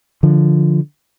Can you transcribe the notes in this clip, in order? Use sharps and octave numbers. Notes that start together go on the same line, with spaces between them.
D3 F3